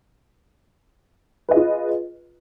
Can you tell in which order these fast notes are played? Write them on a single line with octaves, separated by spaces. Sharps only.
B4 D#5 G#4 F4